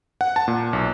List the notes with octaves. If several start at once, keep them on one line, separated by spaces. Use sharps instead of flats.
F#5
A5
A#2
B1